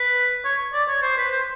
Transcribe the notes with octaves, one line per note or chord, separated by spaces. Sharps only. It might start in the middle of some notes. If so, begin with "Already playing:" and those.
Already playing: B4
C#5
D5
C#5
C5
B4
C5